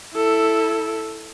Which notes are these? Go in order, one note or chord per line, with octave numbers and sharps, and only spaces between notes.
E4 A4